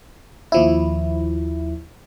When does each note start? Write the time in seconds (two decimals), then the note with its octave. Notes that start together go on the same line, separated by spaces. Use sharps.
0.52 D#2 F3 E4